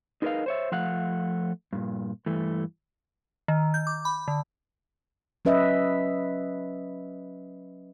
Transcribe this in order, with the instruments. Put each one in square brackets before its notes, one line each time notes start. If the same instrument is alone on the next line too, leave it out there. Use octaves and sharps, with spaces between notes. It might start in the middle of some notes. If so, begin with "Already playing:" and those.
[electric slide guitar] D#4 G#4 A#4 B4 D#5 F5
C5 C#5 E5
F3 A3 F5 F#5
G2 A#2
G2 E3 A3
[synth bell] D#3
G6
D6
B5
D3
[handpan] F#3 C#4 B4 D#5 E5